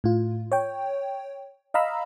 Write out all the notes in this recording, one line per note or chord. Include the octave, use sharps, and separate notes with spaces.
A2 F4
C#5 G5
D#5 F5 A#5 B5 E6